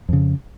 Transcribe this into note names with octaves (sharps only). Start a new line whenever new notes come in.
F2 C#3